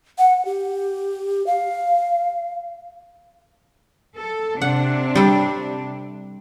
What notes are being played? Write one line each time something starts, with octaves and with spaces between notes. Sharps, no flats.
F#5
G4
F5
A4
C3 D4 F#5
G3 A4